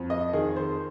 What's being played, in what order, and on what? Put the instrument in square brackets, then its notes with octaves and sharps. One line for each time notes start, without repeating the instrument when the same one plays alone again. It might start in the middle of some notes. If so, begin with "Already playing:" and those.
Already playing: [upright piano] F2
D#5
D#3 G#4
C5